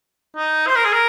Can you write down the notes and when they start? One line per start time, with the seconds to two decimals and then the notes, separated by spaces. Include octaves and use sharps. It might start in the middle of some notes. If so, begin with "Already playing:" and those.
0.36 D#4
0.67 C5
0.76 A#4
0.85 G#4
0.93 A#4